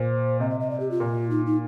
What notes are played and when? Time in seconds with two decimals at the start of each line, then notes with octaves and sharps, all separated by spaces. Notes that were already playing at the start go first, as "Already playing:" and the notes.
Already playing: A#2 C5
0.40 C3 D#5
0.50 D#5
0.60 D#5
0.70 D5
0.80 G4
0.91 F4
1.00 A#2
1.31 D#4
1.46 D#4